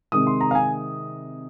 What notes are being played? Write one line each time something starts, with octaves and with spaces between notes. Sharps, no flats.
C3 D#3 G#3 D#6
C6
A#5
F5
G#5